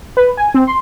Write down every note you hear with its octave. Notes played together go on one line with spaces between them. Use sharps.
B4
G#5
C4
C6